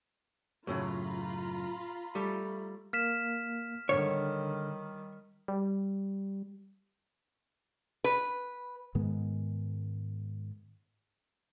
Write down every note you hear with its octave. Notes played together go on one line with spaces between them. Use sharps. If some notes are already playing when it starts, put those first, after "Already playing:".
F#2 A2 C#3 F4 A#5 B5
G3 A3
A#3 F6 B6 E7
D3 D#3 G3 C#5
G3
B4
G#2 D#3 G#3 B3